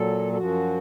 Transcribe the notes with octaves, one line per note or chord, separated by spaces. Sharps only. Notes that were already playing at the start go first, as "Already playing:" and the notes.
Already playing: A#2 F#3 A4
A4
F#2 F3 F#4